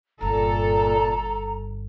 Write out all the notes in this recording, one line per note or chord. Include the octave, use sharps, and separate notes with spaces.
G1 G2 A#2 A4 A#5